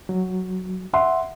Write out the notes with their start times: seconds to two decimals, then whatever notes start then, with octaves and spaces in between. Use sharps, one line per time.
0.09 F#3
0.93 E5 F#5 C6